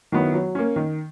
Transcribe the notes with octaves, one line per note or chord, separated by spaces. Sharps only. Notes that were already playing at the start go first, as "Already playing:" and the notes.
D#3 F#3 B3 E4
F#3
A#3 C#4
D#3